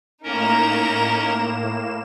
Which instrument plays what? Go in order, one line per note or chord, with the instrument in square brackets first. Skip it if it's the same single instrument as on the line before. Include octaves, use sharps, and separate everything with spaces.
[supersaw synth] A2 A#3 E7 [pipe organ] C#4 A#4 [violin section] D#4 A#5